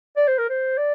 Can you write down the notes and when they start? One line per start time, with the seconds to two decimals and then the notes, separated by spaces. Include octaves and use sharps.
0.17 D5
0.28 C5
0.38 A#4
0.49 C5
0.77 D5